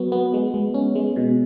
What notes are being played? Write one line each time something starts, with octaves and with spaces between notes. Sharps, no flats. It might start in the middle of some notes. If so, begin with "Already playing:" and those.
Already playing: F#3 B3 F#4
B3
G#3
G#3
C#4
G#3
B2